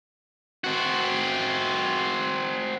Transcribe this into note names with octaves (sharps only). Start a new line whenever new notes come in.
C4 F#4